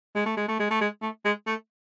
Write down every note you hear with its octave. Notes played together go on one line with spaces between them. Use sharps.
G#3
A3
G#3
A3
G#3
A3
G#3
A3
G#3
A3